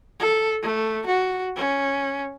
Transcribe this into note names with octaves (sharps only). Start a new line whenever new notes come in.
A4
A3
F#4
C#4